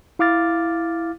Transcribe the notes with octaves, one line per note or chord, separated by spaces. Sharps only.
E4 F5 D6 F6 A6